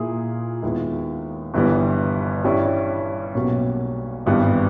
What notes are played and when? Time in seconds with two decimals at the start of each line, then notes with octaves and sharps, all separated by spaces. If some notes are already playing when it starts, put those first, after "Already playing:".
Already playing: A#2 A#3 E4 G#4
0.62 D#2 D#3 G#3 B3 E4
1.54 G1 G2 E3 G3 B3
2.44 G2 E3 G3 C#4 E4
3.35 B1 B2 A#3 C#4 G4
4.26 G#1 G2 E3 G3 B3